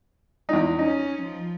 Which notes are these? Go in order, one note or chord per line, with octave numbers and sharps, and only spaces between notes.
E2 D#4
C#4 D#4
F3